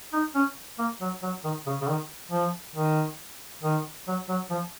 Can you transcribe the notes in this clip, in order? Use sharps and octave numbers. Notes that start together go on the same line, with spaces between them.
D#4
C#4
A#3
F#3
F#3
D#3
C#3
C#3
D#3
F3
D#3
D#3
F#3
F#3
F3